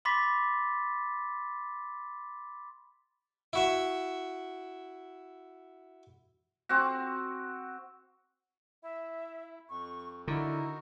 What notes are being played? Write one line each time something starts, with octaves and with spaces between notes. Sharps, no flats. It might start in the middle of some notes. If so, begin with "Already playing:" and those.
B5 C6 D6 A6 B6
E4 F#4 E5
C4 F#4
E4 E5
F2 C#6
D3 D#4 E4 F#4 A#4